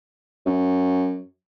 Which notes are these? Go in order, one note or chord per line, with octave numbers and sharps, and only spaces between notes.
F#2